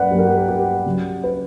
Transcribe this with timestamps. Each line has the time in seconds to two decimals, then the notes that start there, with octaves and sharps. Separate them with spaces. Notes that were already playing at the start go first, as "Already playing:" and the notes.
Already playing: G2 F#3 A#3 C#4 B4 D5 F#5
0.10 G2 F#3 A#3 C#4 G4
0.19 A#4
0.27 G4
0.38 A#4
0.49 G4
0.86 C#3 F#3 C#4
1.24 B4